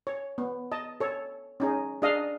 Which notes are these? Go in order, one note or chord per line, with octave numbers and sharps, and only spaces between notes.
C#5
B3
D#5 A5
A4 C#5
C#4 D#4 G#4
D4 G#4 D#5 F5